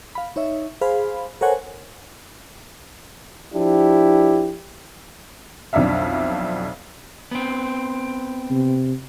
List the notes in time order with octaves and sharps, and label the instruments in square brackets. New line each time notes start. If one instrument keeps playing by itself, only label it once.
[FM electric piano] F5 B5
D#4 C#5 E5
G#4 C5 F5 B5
A4 A#4 C5 C#5 F#5 G#5
[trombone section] F3 D4 E4 G4
[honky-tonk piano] B1 F2 D3 D5 E5 F5
[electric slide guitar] B3 C4
[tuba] C3